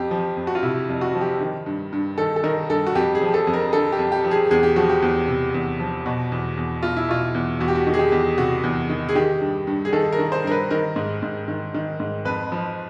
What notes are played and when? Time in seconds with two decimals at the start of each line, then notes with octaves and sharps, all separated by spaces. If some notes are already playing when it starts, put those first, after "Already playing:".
Already playing: F2 G4
0.11 F3
0.37 F2
0.47 F#4
0.55 F4
0.63 C3 E4
0.89 F2
1.01 F#4
1.15 F3
1.21 G4
1.41 D#3
1.66 G2
1.93 G2
2.18 D#3 A4
2.36 A4
2.44 D#3 A#4
2.70 G2 A4
2.87 F#4
2.95 F2 G4
3.15 G#4
3.22 F3
3.34 A4
3.47 F2
3.54 A#4
3.73 D3 A4
3.92 G4
3.99 F2
4.12 G4
4.24 F3
4.31 G#4
4.51 E2 G#4
4.63 G4
4.76 F3 F#4
4.89 G4
5.02 E2
5.28 C3
5.54 E2
5.80 F3
6.06 B2 F#4
6.32 E2
6.57 E2
6.83 B2 F4
6.97 E4
7.08 B2 F4
7.35 E2
7.60 E2 F#4
7.68 G4
7.75 F#4
7.87 D#3
7.94 G#4
7.99 G4
8.12 E2
8.38 C3 F#4
8.63 E2
8.89 D#3
9.09 G#4
9.15 D#3 G4
9.41 G2
9.67 G2
9.85 G#4
9.93 D#3 A4
10.12 A#4
10.19 D#3
10.32 C5
10.44 G2 A#4
10.51 B4
10.71 D#3 A#4
10.96 G#2
11.23 G#2
11.48 D#3
11.74 D#3
12.00 G#2
12.25 F2 B4
12.52 F3